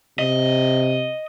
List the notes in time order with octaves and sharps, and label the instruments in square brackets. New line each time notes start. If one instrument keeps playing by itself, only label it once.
[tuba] C3 [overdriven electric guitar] D#5